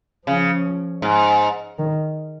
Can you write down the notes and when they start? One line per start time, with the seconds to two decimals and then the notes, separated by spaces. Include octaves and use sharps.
0.27 C#3 F3
1.02 G#2
1.79 D#3